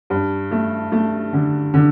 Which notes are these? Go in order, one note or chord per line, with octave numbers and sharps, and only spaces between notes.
G2
A3
A3
D3
D3